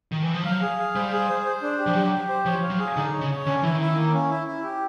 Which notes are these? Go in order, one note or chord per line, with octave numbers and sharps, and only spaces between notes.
D#3
E3
F3
F#3 F5
G#4
F5
G3 C5
G#4
C5
C5
D4
G4
F3
F#3 G4
G4
C5
F3 C#5
F5
F#3
G#4
D3 D#4
C#5
C#3
C#5
D3 C#4
E3 E4
D#3
E4
A#3
C#4
E4
E4
G4